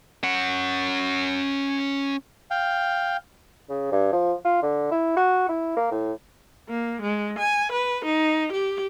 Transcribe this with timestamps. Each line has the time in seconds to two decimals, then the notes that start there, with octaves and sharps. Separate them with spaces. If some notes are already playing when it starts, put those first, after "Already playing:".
0.24 C#4 F#5
2.51 F5 G5
3.70 C#3
3.91 G2
4.13 F3
4.45 F4
4.63 D3
4.91 E4
5.17 F#4
5.49 E4
5.77 A#3
5.91 A2
6.69 A#3
7.02 G#3
7.39 G#5
7.72 B4
8.05 D#4
8.53 G4